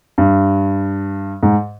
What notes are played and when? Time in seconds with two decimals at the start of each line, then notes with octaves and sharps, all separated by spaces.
0.18 G2
1.43 G#2